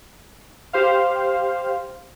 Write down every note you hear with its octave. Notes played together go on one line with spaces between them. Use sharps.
G4 C5 F5